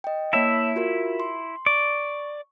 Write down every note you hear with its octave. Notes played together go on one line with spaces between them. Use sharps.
D#5 G5
A#3 E4 C#5 E5 A5
F4 F#4 A#4
C6
D5 C#6